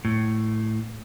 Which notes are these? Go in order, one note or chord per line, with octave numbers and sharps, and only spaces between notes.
A2